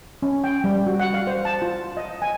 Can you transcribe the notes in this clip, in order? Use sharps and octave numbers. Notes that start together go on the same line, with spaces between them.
C#4
G5
G3
F#4
F#5
F5
C5
A5
F4
D#5
G#5